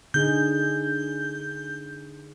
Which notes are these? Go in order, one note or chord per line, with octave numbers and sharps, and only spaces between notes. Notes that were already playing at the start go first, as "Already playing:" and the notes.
D3 D#4 G#4 G6